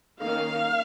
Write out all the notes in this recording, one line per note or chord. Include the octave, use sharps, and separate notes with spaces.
D#3 A#3 C#4 F5